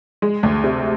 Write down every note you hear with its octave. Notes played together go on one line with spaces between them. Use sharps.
G#3
D2
C3